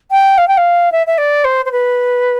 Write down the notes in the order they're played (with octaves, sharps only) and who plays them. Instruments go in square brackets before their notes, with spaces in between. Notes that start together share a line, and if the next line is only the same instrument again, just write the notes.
[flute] G5
F5
G5
F5
E5
E5
D5
C5
C5
B4